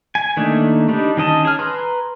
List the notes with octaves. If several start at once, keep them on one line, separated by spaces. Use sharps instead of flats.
G#5
D#3 A3 A#3 D4 D#4
G3 D4 D#4
D#3 C#4 D#5 A5
G#4 F6
B4 A#5 C6